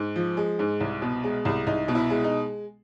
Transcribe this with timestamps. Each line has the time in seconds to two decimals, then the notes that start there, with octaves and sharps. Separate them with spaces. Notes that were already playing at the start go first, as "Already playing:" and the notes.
Already playing: G#2
0.16 F3
0.37 G#3
0.59 G#2
0.80 C2
1.02 B2
1.24 G#3
1.45 C2
1.67 C2 D#4
1.88 B2
1.95 E4
2.10 G#3
2.24 D#4